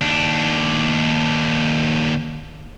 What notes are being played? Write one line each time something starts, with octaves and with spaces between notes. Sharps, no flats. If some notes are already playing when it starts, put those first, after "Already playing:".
D#2 D4